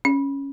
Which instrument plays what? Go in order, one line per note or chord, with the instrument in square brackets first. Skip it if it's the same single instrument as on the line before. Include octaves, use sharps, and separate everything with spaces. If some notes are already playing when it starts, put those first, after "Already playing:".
[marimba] C#4